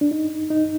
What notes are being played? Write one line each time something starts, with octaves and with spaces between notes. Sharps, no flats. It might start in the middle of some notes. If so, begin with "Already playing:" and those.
D4
D#4
D#4